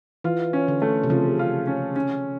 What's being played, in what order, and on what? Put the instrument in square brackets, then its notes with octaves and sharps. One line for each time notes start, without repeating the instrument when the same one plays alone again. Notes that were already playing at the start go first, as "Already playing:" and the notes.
[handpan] E3 [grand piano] F4
[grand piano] C#4
[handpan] D3
[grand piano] A3
[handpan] C3
[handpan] C#3 [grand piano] F3
[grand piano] F4
C#4
C#4